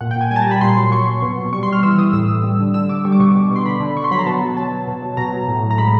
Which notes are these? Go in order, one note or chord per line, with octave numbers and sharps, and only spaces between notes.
A#2 F#5
G5
A#2 G#5
G3 G#5
A5
A#5
G3 B5
A#2 C6
F#3 C6
F#3 C#6
F#3
B2
B2
G3 C#6
C6
G3 F6
E3 E6
E3 D#6
A2 E6
E3
G3
D3
D3 E6
D3 D6
G3 C#6
D6
B2 C#6
B2
B2
C6
D3 B5
D3
D3 C#6
C6
F#3 B5
A#5
B2 A5
F#3
F#3 A5
F#3
B2
F#3
B2 A#5
F#3
A2
A2
A#5
G#3 B5